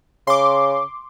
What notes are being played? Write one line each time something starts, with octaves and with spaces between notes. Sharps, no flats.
C#3 C6 D6